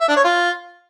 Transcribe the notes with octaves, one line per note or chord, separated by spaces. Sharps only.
E5
D4
C#5
F4